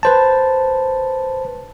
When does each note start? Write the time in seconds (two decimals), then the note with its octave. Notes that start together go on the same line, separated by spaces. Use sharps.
0.03 B4 C5 A5